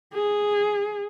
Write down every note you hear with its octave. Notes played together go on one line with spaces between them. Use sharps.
G#4